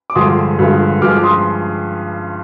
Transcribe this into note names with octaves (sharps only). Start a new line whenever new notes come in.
D6
G2 D3 F3 G#3 C6 D#6
G2 D3 F3 G#3
G2 F3 G#3 D6 F6
C6 D#6